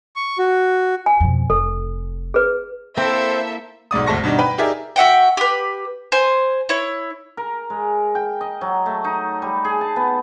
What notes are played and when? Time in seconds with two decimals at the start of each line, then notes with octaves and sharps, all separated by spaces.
0.16 C#6
0.38 F#4
1.06 G#5
1.20 F2 B2
1.50 F1 A4
2.34 G#4 B4
2.97 A#3 C4 E4 A4 C5 E5
3.91 B1 G#2 D5 D#6
4.07 D1 G#1 A3 A5 C#6 A#6
4.24 G2 B2 D#3 D4 D#4
4.38 B4 G5 B5
4.58 D#4 G4 G#4 A#4 D5 E5
4.96 F#4 E5 F#5 G5
5.37 G4 B4
6.12 C5 G#5
6.69 E4 C#5
7.37 A#4
7.70 G#3
8.15 G5
8.41 D#5
8.61 F#3
8.86 A3
9.04 D#4
9.42 G3
9.65 G#4
9.81 A5
9.96 B3